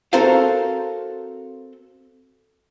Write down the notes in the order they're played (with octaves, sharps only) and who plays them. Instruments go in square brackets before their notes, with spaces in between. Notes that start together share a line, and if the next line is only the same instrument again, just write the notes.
[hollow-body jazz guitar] C4 F#4 A4 A#4 C5 F5